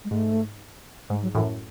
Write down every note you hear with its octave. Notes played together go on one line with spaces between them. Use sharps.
G#3
G#2 A3
G#2 G#3
F#3
F#2 A2 E3